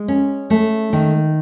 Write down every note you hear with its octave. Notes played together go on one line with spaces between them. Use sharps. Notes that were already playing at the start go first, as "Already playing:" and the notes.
Already playing: G#3
C#4
A3
D#3